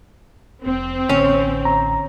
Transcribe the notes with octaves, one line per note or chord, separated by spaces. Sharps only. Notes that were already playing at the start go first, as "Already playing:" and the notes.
F1 C4
A1 D3 C#4
A#5